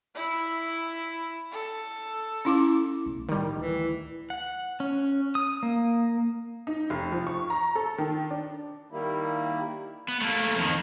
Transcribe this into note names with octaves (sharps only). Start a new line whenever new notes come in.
E4
A4
C#4 E4 D6
B1 A3
A2 D#3 G3 C4
D2 E3
F#5
C#4
D#6
A#3
D#4
F1
F3
C#6
A#5
A4
D#3
D4
D#3 G3 A#3 E4
B3
A3 A#3
F2 D#3